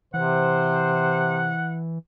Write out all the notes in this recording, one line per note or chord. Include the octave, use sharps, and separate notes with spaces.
C3 E3 C5 F#5